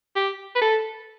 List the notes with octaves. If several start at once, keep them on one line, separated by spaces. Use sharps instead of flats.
G4
B4
A4